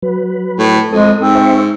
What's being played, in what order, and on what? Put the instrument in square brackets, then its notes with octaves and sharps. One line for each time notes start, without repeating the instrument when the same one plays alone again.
[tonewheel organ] F#3 B4
[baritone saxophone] A2
[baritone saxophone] F2 [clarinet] G#3 [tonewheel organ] A4 D#6
[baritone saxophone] G#2 [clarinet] C4
[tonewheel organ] C5 E5 C#6